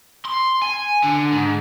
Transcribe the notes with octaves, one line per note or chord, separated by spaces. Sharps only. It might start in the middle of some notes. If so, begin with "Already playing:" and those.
C6
G#5
D3
G#2